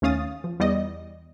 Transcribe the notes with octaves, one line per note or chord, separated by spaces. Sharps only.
D#2 A3 C#4 F5 D#6 A6
F3
E2 G3 D5 D#5